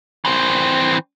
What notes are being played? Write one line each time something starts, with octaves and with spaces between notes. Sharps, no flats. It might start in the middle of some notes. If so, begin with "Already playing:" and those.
E3 C4